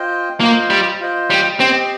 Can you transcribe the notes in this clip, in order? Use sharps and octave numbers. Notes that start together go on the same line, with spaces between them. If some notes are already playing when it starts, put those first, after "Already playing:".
Already playing: F4 C5 D#5 G5
A#3 F4 C5 D#5
G3
F4 C5 D#5
G3
C4 G4 D#5 G5